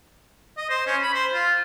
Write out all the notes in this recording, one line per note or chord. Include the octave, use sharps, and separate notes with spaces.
D#5
C5
C#4
B5
C5
F4